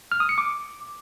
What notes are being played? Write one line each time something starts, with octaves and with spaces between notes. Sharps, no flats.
F6
D#6
C#7
D6